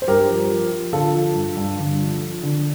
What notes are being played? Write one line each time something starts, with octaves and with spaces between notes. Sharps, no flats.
C5
G2 G4 A#4
F3
F3
F3
D3 F4 A4
F3
G2
G2
D3
F3
F3
D3